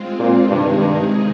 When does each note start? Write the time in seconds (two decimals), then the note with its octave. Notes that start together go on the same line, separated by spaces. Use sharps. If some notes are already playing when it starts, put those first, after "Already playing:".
Already playing: G#3 C4 F4
0.19 A#2
0.49 G2 C3 D#3 G#3 D#4 G#4
0.78 G2